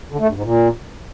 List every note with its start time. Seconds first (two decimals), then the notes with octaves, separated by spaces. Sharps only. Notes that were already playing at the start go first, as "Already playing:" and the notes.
0.12 D3
0.20 A3
0.28 G2
0.36 G#2
0.44 A#2